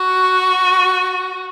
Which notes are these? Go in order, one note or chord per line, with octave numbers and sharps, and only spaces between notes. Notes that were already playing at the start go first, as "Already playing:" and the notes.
Already playing: F#4